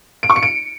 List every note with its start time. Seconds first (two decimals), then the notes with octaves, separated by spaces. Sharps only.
0.23 D7
0.30 C#6
0.36 C#7
0.43 D7